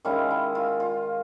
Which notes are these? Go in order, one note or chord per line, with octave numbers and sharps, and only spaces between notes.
D#3 G#3 C#4 E4 F4
E4
F4
F4